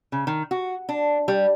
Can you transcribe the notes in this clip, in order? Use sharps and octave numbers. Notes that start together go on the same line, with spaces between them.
C#3
D#3
F#4
D4
G3